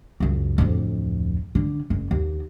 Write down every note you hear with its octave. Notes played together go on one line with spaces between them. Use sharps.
C#2 F#2
D1 F2
D3
F#1
D#2